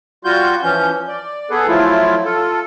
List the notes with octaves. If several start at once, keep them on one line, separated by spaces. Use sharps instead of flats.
G3 F4 F#4 G6
E3 F3 C#4 G6
D5
B3 G#4 A4 B4
F3 F#3 A3 E4 F4
F4 A4